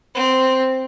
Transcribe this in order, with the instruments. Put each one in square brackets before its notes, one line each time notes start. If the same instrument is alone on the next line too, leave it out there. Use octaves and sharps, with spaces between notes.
[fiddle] C4